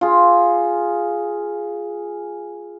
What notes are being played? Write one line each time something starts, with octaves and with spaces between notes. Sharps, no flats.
F4 G#4